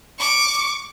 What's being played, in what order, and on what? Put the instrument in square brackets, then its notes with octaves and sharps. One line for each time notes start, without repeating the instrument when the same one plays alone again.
[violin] C#6 D6